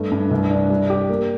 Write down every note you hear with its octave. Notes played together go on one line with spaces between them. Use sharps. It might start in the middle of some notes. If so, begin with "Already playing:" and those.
Already playing: G2 A3
G2
C2
D4
G3
G4
A#3